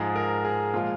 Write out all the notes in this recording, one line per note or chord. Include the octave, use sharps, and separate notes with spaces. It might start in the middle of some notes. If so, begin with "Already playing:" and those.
Already playing: G#2 F3 G#3 G#4
A#4
G#4
A#2 F3 G#3 F4